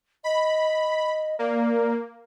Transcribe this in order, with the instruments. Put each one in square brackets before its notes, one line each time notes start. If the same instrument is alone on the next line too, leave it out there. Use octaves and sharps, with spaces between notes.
[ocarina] D#5 [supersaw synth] B5
[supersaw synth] A#3 [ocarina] D5